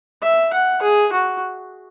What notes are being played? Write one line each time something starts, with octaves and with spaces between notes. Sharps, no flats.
E5
F#5
G#4
F#4